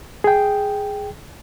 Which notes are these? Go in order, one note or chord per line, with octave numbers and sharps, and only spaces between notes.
G#4 G5